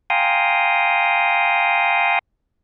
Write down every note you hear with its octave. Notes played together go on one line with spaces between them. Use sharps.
F5 G5 G#5 A#5 C6 D#6